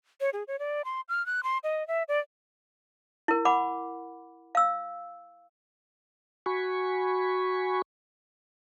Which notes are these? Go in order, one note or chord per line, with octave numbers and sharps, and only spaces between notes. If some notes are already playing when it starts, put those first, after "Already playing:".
C#5
G#4
C#5
D5
C6
F6
F#6
C6
D#5
E5
D5
E4 A#4
F#5 B5 D6
F5 E6
F#4 G#5 B5 C#6